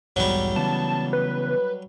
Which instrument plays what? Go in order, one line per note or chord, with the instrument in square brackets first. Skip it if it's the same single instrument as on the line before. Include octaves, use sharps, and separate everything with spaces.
[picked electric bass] B1 E2 G#2 [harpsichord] F#3 G3
[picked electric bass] C#3 E3 B3 [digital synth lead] A5
[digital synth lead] B4